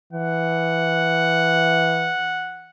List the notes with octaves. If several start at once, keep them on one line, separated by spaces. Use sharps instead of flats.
E3 F#5